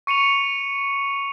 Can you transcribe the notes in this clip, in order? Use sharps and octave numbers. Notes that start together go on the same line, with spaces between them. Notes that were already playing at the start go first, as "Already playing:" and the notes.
C#6 C#7 D#7 F7